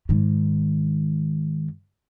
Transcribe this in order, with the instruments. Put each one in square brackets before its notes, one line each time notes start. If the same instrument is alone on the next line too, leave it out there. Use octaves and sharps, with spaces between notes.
[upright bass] G#2 D#3